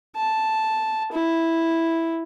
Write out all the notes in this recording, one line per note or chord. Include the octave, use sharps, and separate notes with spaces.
A5
E4